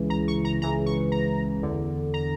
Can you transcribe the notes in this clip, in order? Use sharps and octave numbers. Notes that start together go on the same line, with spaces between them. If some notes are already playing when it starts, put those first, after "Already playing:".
Already playing: C#2 C#3 E3
A#5
C#6
A#5
C#2 C#3 E3 A#5
C#6
A#5
E2 D3
A#5